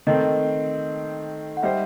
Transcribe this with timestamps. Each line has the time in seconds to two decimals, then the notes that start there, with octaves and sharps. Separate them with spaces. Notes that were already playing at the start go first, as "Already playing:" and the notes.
0.07 D#3 A3 C4 D#5
1.57 F#5
1.63 G3 D#4 G4 C5 E5